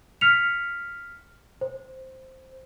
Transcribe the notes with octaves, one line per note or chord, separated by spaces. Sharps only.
F6 B6 C#7 F7
C5